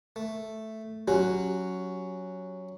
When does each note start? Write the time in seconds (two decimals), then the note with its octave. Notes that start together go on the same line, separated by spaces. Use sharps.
0.16 A3
1.08 F#3 C#4 F#4 G4